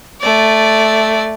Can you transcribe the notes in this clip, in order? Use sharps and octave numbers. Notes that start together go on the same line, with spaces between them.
A3 D5